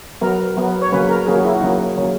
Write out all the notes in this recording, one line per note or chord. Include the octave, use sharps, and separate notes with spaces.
F#3 B3 A#4
F#3 B3
C#5
C#3 F#3 A#3 C#4 B4
A#4
C#3 F#3 A#3 C#4 G#4
F#4
E4
F#4
C#3 F#3 A#3 C#4 D#4
C#3 F#3 A#3 C#4